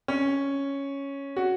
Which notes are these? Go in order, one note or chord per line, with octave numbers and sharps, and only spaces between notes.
C#4
F#4